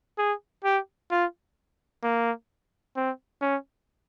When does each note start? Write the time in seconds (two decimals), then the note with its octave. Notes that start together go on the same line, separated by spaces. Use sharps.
0.19 G#4
0.64 G4
1.11 F4
2.03 A#3
2.96 C4
3.42 C#4